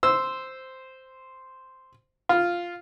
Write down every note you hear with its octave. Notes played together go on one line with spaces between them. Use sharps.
C5 E6
F4